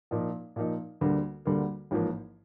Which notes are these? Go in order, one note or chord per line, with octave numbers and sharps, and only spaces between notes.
A#2 F3 A#3 D#4
A#2 F3 A#3 D#4
D2 D3 G3 A#3
D2 D3 G3 A#3
A1 G#2 F3 A#3